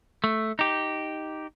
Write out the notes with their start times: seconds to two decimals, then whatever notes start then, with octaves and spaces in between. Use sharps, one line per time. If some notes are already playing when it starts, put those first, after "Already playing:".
0.24 A3
0.59 D#4 G4